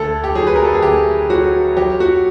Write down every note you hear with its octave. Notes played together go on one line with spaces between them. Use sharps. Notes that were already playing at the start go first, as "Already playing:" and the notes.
Already playing: D2 A4
G4
F#3 G#4
B4
A#4
A4
G#4
D2 G4
F#3 F#4
F#3 G4
F#4